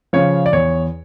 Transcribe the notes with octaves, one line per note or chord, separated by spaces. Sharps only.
C#3 F3 C#5
D5
E2 C#5